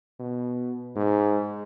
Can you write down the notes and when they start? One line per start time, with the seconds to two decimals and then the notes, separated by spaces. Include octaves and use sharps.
0.20 B2
0.96 G#2